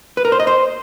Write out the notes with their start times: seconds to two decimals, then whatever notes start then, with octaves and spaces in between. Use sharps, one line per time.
0.17 B4
0.25 A#4
0.32 C5
0.40 D#5
0.47 C5